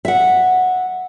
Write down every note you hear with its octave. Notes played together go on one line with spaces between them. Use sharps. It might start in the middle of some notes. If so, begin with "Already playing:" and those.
E5 F#5